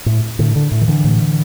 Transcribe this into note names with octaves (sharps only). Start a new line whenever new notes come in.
A2
A2 D3
D3
A2
D#3
D3 E3
A2